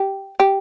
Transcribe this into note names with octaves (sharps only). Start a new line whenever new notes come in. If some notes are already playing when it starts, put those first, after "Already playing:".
Already playing: G4
G4